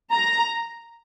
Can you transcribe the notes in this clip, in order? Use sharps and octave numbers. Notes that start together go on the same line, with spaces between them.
A#5